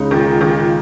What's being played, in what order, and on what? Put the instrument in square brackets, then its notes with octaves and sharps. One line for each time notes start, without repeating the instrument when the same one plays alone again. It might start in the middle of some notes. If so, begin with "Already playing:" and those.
Already playing: [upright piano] C#2 C#3 G#3 D#4
[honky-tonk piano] A#2 D#3
A#2 D#3